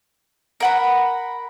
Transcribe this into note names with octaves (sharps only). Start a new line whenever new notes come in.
A#4 F#5 B5